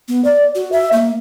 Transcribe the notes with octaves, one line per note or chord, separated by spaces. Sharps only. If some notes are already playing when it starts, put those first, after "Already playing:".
B3
D5
F#4
E5
A#3